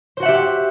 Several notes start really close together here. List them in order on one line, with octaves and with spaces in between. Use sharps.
C5 F#4 F#5 E5 G4